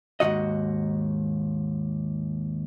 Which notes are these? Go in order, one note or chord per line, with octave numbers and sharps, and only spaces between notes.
D#2 G#2 C3 F#4 D#5